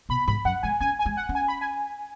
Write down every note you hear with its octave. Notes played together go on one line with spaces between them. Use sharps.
B2 B5
G#2 B5
F#2 F#5
G#3 G#5
C#4 G#5
G#5
G#3
F#5
C#4
G#5
B5
G#5